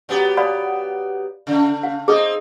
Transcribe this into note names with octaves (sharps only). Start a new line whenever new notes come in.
F#3 B3 G4
D5 F5 B5
C#3 A3
F5
C4 D#4 G#4 D#5 D#6